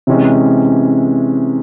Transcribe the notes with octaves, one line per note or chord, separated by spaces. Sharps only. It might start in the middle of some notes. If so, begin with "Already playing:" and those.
C3 E3 G#3 C#4